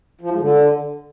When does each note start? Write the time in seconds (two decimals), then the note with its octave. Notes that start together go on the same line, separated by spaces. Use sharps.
0.21 F3
0.31 G#2
0.40 D3